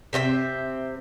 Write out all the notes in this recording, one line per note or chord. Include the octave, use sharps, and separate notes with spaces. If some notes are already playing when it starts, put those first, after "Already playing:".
C3 C4 F4 E5